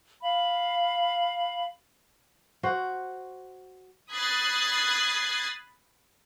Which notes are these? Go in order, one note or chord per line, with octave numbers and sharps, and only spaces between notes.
F5 B5
F#4 C5
B5 D#6 F#6 G#6 A6 C7